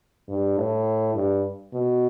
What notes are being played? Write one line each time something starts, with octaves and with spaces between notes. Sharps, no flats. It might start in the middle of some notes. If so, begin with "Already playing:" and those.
G2
A2
G2
B2